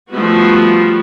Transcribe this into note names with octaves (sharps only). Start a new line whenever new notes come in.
F3 G3 A3 B3 F#4